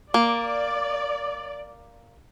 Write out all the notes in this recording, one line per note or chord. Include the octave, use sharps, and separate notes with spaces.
A#3 D5